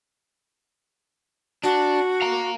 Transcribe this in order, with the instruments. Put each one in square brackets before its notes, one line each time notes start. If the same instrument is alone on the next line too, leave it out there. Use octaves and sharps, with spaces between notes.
[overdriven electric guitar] D4 [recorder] F#4
[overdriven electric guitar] F5 A#5